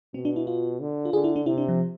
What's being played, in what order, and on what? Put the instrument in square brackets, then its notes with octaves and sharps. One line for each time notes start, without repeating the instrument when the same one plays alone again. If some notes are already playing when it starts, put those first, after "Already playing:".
[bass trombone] B2 [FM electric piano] C4
[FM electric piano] D4
E4
F4
[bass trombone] D3
[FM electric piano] F4
[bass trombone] D3 [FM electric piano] G#4
[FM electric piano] E4
D4
[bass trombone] C3 [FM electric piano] E4
[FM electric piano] D4
F3